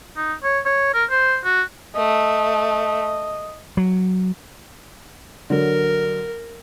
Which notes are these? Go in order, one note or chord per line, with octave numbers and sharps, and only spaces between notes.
D#4
C#5
C#5
A#4
C5
F#4
A3 D#5
F#3
D3 F#3 A#4